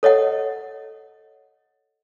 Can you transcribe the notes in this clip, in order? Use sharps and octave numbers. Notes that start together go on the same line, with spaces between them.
A4 C#5 D#5 F#5